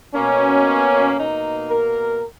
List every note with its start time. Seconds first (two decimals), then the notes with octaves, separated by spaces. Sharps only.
0.14 B2 A#3 C#4
1.18 B2 A#3 D#4
1.70 A#4